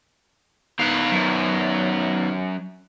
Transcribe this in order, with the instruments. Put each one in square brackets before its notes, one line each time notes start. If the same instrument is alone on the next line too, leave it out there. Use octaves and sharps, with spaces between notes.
[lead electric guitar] D#3 B3 [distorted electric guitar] B4 F5
[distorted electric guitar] F#2